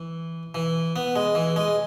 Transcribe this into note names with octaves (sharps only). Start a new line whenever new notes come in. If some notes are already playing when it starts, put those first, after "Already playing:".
Already playing: E3
E3
B3
G#3
E3
G#3